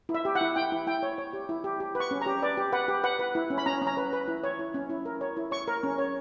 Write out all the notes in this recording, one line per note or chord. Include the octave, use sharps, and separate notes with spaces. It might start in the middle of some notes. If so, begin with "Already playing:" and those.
E4
E5
G4
F#5
E4
E4 G5
E4
E4 G5
C#5
C#5
G4
E4
G4
G4
B4
C#6
C#4
G4 A#5
B4 D5
G4
B4 F#5
G4
B4 F#5
B4
E4
C#4
B5
C#4 A#5
C#4
A#5
B4
B4
E4
C#5
E4
C#4
E4
A#4
C#5
E4
C#5 C#6
A#4
C#4
C#5